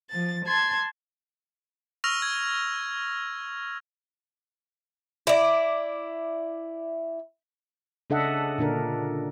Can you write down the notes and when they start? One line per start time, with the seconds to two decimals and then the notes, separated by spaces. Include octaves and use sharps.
0.11 F3 A6
0.45 A5 C6 G#6
2.04 C#6 E6 F6 A#6 F7
2.22 G#6
5.27 E4 D5
8.10 C#3 D4 A4 D#5 E5 F#5
8.58 A#2 D3 D4 A#4